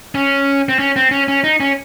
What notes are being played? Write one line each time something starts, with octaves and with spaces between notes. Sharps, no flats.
C#4
C4
C#4
C4
C#4
C#4
D#4
C#4